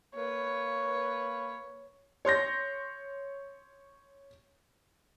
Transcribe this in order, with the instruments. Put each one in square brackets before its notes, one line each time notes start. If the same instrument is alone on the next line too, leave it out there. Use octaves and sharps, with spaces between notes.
[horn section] A#3 B4 [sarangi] C#5
[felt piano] C#5 C6 G6 A#6